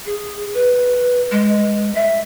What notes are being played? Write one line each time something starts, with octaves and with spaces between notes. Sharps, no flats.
G#4
B4
G#3
E5